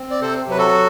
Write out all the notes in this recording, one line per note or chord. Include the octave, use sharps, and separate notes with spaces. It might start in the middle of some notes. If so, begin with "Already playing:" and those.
Already playing: C4
D5
C3 A4 C5
F#3 B4
F#4 A4